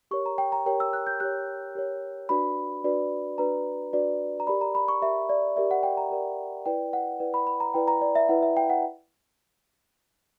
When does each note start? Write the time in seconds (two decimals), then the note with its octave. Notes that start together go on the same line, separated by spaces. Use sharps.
0.11 G4 A#4 C#5 C#6
0.26 A#5
0.38 G5
0.52 A#5
0.66 G4 A#4 C#5 G5
0.80 E6
0.93 F#6
1.07 G6
1.20 G4 A#4 C#5 F#6
1.75 G4 A#4 C#5
2.29 D4 F#4 B4 D5 B5
2.84 D4 F#4 B4 D5
3.38 D4 F#4 B4 D5 A#5
3.93 D4 F#4 B4 D5
4.40 A#5
4.47 G4 A#4 D5 B5
4.61 A#5
4.75 B5
4.88 C#6
5.02 G4 A#4 D5 E5
5.29 D5
5.56 G4 A#4 D5 E5
5.71 F#5
5.83 G5
5.97 A#5
6.10 G4 A#4 D5
6.66 E4 B4 D5 G5
6.93 F#5
7.20 E4 B4 D5
7.34 B5
7.47 B5
7.60 A#5
7.74 E4 B4 D5 G5
7.88 A#5
8.01 D5
8.15 E5
8.29 E4 B4 D5 F#5
8.43 E5
8.57 G5
8.70 F#5